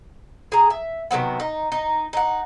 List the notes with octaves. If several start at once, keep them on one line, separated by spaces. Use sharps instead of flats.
G#4 A#5
E5
C3 D#3 F#3 B3
D#4
D#4
D#4 F#5